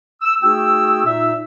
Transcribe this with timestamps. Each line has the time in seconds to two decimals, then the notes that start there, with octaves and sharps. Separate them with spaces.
0.21 E6
0.42 A3 D#4 F#4 G#4 G5 E6
1.05 A#2 D#4 E5 E6